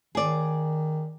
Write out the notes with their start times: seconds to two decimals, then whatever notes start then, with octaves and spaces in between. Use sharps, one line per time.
0.15 D#3 G#4 D5